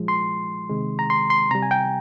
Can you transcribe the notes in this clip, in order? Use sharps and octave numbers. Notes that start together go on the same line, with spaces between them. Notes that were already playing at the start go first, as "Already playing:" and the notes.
Already playing: A#2 F3 G#3
C6
C3 D#3 G#3
A#5
C6
C6
C3 G3 A#5
G#5
G5